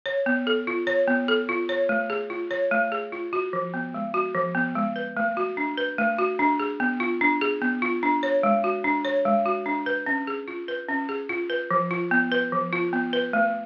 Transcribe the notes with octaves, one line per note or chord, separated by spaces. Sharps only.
C#5
B3
A4
F4
C#5
B3
A4
F4
C#5
A3
G#4
F4
C#5
A3
G#4
F4
F#4
F3
B3
G#3
F#4
F3
B3
G#3
B4
A3
F#4
D4
B4
A3
F#4
D4
G#4
B3
F4
D4
G#4
B3
F4
D4
C#5
G#3
F#4
D4
C#5
G#3
F#4
D4
B4
C#4
G#4
F4
B4
C#4
G#4
F4
B4
F3
F4
B3
B4
F3
F4
B3
B4
A3